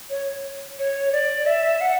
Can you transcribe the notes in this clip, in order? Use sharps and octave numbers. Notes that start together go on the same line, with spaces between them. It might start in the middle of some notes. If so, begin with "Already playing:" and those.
C#5
C#5
D5
E5
F#5